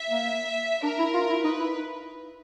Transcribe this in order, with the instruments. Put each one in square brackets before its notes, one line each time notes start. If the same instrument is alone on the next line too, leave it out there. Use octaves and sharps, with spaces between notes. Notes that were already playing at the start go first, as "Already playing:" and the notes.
Already playing: [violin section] E5
[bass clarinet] A#3
[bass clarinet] D4 [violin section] A#4
[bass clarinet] E4
F4
E4
[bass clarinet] D#4 [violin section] B4
[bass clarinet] E4